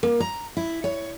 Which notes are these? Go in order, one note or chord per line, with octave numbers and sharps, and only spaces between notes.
A#3
A#5
E4
C#5